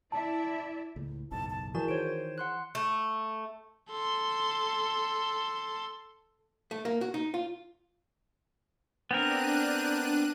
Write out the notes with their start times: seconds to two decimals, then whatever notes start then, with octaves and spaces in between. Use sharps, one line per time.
0.12 E4 D5 E5 A5
0.96 C#2 A2
1.31 F#1 B1 G#2 A5
1.50 A5
1.75 E3 F#4 G#4 A#4 D5 A5 E7
1.88 D#3 C5 C#5 D7
2.38 F#5 C6 F#6
2.75 A3
3.90 A4 C6
6.71 A3
6.85 A#3
7.01 F#4
7.14 D#4
7.34 F4
9.11 B3 C4 D4 A#4 F#6 D#7